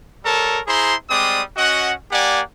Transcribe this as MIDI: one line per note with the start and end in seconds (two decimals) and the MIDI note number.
0.24 0.60 55
0.24 0.60 69
0.24 0.60 70
0.24 0.60 73
0.24 0.60 81
0.67 0.94 64
0.67 0.94 68
0.67 0.94 72
0.67 0.94 82
0.67 0.94 84
1.09 1.41 55
1.09 1.41 56
1.09 1.41 60
1.09 1.41 74
1.09 1.41 87
1.56 1.93 61
1.56 1.93 66
1.56 1.93 75
1.56 1.93 78
2.11 2.41 58
2.11 2.41 67
2.11 2.41 74
2.11 2.41 78
2.11 2.41 80